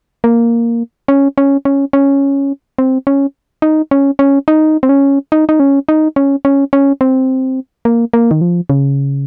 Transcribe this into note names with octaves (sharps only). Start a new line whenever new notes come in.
A#3
C#4
C#4
C#4
C#4
C4
C#4
D#4
C#4
C#4
D#4
C4
C#4
D#4
D#4
C#4
D#4
C#4
C#4
C#4
C4
A#3
A#3
D#3
F3
C#3